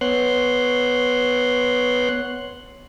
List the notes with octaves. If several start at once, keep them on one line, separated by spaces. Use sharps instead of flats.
B3 C#5 C6 F#6